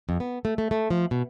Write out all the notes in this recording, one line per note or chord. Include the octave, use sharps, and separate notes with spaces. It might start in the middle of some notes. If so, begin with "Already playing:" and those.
F2
B3
A3
A3
A3
F3
B2